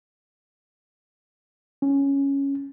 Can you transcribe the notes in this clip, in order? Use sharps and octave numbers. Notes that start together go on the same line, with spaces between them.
C#4